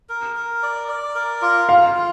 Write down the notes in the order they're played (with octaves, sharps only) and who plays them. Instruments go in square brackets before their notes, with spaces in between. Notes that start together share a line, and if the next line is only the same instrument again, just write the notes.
[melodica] A#4
A#4
D5
D5
A#4
F4
[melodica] F4 [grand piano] F5
[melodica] F4